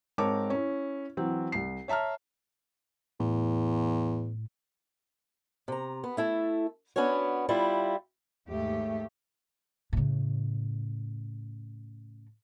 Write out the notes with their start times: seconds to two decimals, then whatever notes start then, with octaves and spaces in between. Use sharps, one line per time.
0.18 G#2 C4 A#4 C#5 A5 D6
0.50 C#4 E4
1.17 E3 F#3 C4
1.52 C2 C7
1.88 C#5 E5 A5 A#5 F6
3.20 E2 A2
5.68 C3 A#5
6.04 B3
6.17 A3 E4 A4
6.96 B3 C#4 D4 F#4 C#5
7.49 G3 E4 F4
8.49 D#2 G#2 A3 G4
9.93 A2 C#3